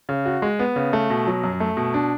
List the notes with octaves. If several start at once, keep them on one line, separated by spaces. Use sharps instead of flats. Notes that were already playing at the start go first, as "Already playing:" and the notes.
C#3
F#4
G#3
B3
C#3
A3
B2
F#3
F#2
A3
B2
D4